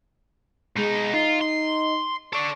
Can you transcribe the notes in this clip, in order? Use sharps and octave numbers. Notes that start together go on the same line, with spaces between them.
B2 G#3 D#4
D#4 F4
C6
A4 D5 C#6